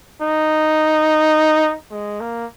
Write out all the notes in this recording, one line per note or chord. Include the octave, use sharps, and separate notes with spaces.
D#4
G#3
A#3